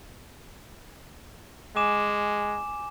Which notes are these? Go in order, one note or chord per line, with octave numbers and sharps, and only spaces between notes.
G#3 G#5 D6 E7